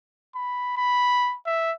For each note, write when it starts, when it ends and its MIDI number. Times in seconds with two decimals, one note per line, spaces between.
0.35 0.75 83
0.77 1.36 83
1.46 1.73 76